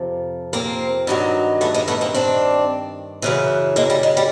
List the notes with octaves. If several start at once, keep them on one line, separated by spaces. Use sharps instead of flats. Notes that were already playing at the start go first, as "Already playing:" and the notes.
Already playing: F2 C3 F3
A#3 C4
G2 D#3 F#3
A3 B3
G#3 A#3
A3 B3
A#3 C4
C4 D4
F#2 C#3 E3
G#3 A#3
G3
G#3
G3